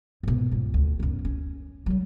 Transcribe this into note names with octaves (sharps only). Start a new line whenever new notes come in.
G#2 B2
C#2 G#2
D2
B1 F#2
C#4
F#3 G3